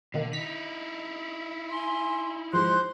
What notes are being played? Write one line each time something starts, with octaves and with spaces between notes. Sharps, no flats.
B2 D3 D#3 A#3
D#4 E4 B6
G#5 C6
G#2 F3 C5 C6 F#6